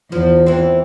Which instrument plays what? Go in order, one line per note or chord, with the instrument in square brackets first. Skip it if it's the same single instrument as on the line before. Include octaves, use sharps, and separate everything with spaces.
[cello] E2 [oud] F3
[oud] E3 C4